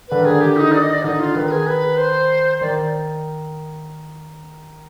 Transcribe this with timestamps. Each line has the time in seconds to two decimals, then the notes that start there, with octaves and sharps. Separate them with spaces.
0.08 D3 B4
0.19 D#3
0.25 D3 G#4
0.40 D#3 G4
0.57 D#4
0.73 D5
0.82 D#5
0.94 D5
1.04 D3 D#4
1.19 F4
1.35 D#3 B4
1.47 B4
1.51 G#4
1.66 B4
1.97 C5
2.61 D#3 D5